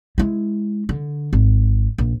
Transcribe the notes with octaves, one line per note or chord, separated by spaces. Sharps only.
G#3 E4
D3
G#1
A#1